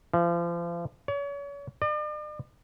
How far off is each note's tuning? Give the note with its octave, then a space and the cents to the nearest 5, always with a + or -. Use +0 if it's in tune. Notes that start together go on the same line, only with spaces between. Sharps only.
F3 -35
C#5 +35
D5 +45